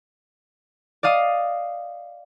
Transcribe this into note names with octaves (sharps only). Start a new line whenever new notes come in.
D5 D#5 F5 D#6